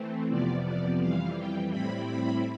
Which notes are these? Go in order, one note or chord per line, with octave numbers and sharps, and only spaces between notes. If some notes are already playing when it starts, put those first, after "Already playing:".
Already playing: E3 A3 C4
F2 C3 F3 B3 D5
D5
F2 E3 G3 F5
G5
A2 G3 C4 E4 B5
B5